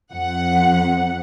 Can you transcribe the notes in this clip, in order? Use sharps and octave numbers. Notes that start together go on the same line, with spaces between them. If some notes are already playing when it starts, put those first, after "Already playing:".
F2 F#5